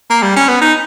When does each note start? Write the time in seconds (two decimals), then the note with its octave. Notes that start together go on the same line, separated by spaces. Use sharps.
0.10 A#3
0.23 G3
0.36 C#4
0.48 B3
0.61 D#4